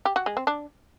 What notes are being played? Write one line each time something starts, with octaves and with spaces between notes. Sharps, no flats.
G4
F#4
G#3
C4
D4